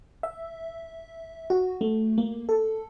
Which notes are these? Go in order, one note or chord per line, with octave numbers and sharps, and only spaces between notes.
E5
F#4
A3
A#3
A4